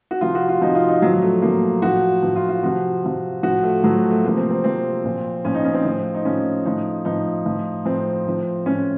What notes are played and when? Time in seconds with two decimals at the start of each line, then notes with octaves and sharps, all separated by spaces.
0.11 F#4
0.21 C3 F3 F4
0.35 F#4
0.49 F4
0.61 C3 F3 D#4
0.75 F4
0.88 D#4
1.02 A2 F#3
1.06 F3
1.13 F#3
1.22 A3
1.42 A2 F3 A#3
1.82 A2 F3 F#4
2.23 A2 F3
2.36 F4
2.49 F4
2.63 C3 F3 F#4
3.03 C3 F3
3.43 A2 F3 F#4
3.63 A3
3.83 A2 F3 F#3
3.97 A3
4.10 A3
4.24 C3 F3 A#3
4.37 C4
4.50 C4
4.64 C3 F3 C4
5.04 A#2 F3
5.45 A#2 F3 C#4
5.55 D#4
5.65 C#4
5.74 C4
5.85 A2 F3
6.14 D#4
6.25 A2 F3 C#4
6.65 A2 F3 D#4
7.05 A2 F3 D#4
7.46 A2 F3
7.86 A2 F3 C4
8.26 A2 F3
8.66 A2 F3 C#4